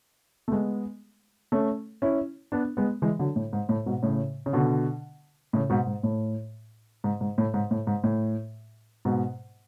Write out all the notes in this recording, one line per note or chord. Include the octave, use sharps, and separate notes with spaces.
A3
G#3 B3
A3 C#4
C#4 E4
B3 D4
G#3 B3
E3 G#3
D3 F#3
A2
G#2
A2
G#2 B2
A2 C#3
C#3
B2 D3
A2 C#3
G#2 B2
G#2
A2
G#2
G#2
A2
G#2
A2
G#2
A2
G#2 B2